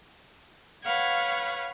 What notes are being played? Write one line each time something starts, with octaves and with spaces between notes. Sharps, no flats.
B4 C#5 F5 F#5 G#6